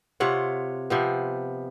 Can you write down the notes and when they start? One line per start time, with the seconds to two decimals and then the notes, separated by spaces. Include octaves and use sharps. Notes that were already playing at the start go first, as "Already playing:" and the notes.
0.20 C3 F4 C#5 F#5
0.90 C3 F3 B3